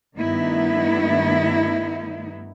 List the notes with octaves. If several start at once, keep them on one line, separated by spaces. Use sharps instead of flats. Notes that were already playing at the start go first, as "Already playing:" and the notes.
G2 D#3 A3 B3 D#4 E4